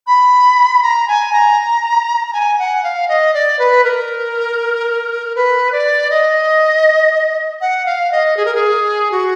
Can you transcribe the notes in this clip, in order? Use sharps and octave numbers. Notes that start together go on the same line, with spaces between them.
B5
A#5
G#5
A#5
A#5
G#5
F#5
F5
D#5
D5
B4
A#4
B4
D5
D#5
F#5
F5
D#5
G#4
A#4
G#4
F#4